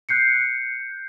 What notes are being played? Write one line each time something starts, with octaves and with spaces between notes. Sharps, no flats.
F#6 G6 C7 C#7